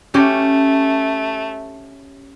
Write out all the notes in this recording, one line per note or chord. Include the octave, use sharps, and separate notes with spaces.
A3 C#4 G4